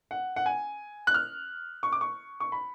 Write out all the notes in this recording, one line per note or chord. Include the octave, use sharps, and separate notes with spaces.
F#5
F#5
G#5
F#6
F6
C#6
D6
C#6
C#6
B5